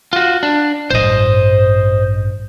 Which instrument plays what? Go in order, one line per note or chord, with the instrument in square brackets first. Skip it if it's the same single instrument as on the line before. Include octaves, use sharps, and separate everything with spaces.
[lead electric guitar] F4 F#4
D4
[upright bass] A1 G2 [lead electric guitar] C5 D#5